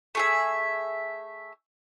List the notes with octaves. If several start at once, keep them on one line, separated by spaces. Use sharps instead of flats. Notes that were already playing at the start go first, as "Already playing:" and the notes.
A3 G#4 E5